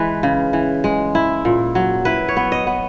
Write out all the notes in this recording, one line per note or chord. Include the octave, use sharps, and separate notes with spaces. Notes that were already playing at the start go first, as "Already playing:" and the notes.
Already playing: E3 G#3 B4
C#3
E3
G#3
E4
A#2
F#3
E4 B4
C#5
B3
D#5
B3